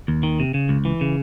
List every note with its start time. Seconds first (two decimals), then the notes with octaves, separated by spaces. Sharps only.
0.08 D#2
0.23 D#3
0.40 C3
0.54 C#3
0.69 C#2
0.85 E3
1.01 C#3